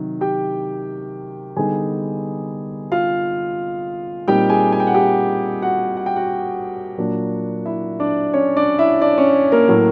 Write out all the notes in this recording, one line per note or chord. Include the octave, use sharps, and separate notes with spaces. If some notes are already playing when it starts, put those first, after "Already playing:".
Already playing: C3 D#3 F#3
G4 G5
D3 G3 B3 D#4 G#4 G#5
F4 F5
A#2 G3 C4 D#4 G4 G5
G#4 G#5
G#5
G5
F#5
G4 G5
F#4 F#5
F#5
G5
F#4 F#5
A#2 F#3 A#3 D4
E4 E5
D4 D5
C#4 C#5
D4 D5
E4 E5
D4 D5
C#4 C#5
A#3 A#4
A2 F#3 A3